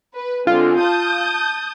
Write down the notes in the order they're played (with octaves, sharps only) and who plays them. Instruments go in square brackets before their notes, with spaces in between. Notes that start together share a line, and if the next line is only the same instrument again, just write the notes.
[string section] B4
[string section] D3 G#3 C4 [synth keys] F4
[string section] A5 D#6 G6